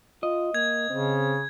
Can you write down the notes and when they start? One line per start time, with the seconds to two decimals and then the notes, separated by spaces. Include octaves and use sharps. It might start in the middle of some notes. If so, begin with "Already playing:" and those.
0.23 F4 D#5
0.54 A#3 G#6
0.90 C#3 C4